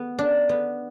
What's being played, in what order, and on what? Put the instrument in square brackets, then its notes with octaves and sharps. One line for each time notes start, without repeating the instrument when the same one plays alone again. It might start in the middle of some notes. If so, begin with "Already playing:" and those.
Already playing: [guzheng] B3
D4
B3